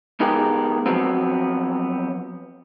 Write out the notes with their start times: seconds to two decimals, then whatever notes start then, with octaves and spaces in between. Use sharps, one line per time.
0.20 G#3 B3 D#4 G4 G#4 A#4
0.86 F3 F#3 B3 C4